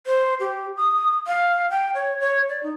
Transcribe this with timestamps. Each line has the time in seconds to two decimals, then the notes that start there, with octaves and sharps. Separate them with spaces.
0.07 C5
0.40 G4
0.77 D#6
1.27 F5
1.70 G5
1.95 C#5
2.20 C#5
2.49 D5
2.63 D#4